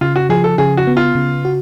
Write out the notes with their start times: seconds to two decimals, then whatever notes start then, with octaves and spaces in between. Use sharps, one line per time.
0.01 C#3 F4
0.16 F#4
0.29 F3 G#4
0.44 A4
0.58 C#3 G#4
0.77 F#4
0.87 B3
0.97 F4
1.15 C#3
1.45 F#4